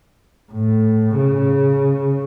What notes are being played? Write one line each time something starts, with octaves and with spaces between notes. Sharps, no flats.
A2
C#3